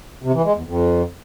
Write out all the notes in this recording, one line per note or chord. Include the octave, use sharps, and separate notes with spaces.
C3
E3
G#3
E2
F2